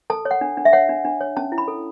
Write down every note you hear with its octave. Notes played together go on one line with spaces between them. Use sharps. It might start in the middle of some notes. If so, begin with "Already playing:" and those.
A4 A5
C#5
F#5
D4
D4
E5
C#5 F#5
D4
D4
C#5
C#4 A5
E4
B5
A4